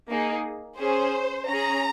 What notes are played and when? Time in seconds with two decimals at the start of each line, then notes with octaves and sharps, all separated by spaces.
0.09 A#3 D#4 G#4
0.79 C#4 G#4 C5
1.48 C#4 G#4 A#5